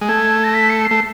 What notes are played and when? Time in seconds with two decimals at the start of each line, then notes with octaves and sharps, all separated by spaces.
0.01 G#3
0.08 A3 G#6
0.44 A#6
0.54 B6
0.70 C#7
0.85 C7
0.91 A3